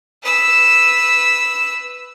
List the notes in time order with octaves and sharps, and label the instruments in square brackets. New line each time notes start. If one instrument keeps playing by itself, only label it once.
[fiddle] B4 E6